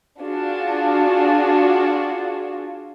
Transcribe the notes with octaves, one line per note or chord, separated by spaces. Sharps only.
D4 F4 F#4 G#4